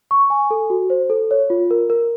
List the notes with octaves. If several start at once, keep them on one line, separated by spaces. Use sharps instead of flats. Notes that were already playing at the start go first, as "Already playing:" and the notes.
C#6
G#5
A4
F#4
C5
A4
C#5
F4
A#4
A#4